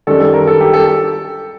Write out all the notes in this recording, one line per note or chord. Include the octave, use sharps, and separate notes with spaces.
F#2 D#3 G3 D4 A4
A4
A#4
A4
G4
A4